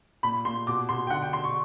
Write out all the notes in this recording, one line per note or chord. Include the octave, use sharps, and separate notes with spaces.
A#2 B5
A#2 C6
B2 D6
B2 C6
G5
D3 F#5
G5
D3 C6
C#6